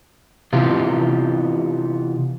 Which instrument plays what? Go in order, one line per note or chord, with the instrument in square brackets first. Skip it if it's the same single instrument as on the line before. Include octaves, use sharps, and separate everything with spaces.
[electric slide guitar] C3 E3 B3 F4 G4